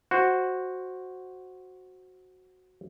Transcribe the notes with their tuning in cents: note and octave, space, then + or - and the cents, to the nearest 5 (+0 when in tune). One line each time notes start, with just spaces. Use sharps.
F#4 +0 C5 +5 F#5 +0